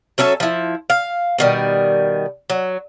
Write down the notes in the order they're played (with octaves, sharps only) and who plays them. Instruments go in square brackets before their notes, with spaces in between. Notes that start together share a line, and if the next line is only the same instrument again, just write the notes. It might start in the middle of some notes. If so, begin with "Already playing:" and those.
[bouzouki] F#3 C#4 A4 E5
F3 E4
F5
B2 D#3 G3
F#3